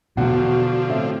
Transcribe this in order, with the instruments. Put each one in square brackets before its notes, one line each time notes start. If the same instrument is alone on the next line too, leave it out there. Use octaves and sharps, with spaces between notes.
[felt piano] E2 F#5 [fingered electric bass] B2 [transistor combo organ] D3 F3 [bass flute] F#4
[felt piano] A2 C4 E5